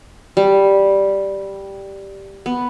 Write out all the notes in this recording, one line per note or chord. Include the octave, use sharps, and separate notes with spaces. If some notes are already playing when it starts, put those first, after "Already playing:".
G3
B3